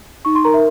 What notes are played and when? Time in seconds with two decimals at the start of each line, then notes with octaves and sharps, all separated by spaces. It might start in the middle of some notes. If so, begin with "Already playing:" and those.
0.25 D#4 C#6
0.35 C6
0.44 A#4 A#5
0.54 E5